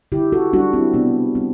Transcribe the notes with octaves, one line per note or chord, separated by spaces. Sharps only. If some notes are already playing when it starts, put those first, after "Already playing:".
D3 E4 G4
F#4 A4
G3 D4 F#4
C4 E4
C3 B3 D4
G3 C4